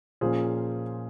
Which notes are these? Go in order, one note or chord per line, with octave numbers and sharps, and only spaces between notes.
A#2 F3 A#3 C#4 G#4 C5